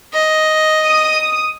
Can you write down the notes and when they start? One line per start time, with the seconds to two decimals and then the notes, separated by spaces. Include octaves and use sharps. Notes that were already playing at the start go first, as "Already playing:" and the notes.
0.14 D#5
0.84 D#6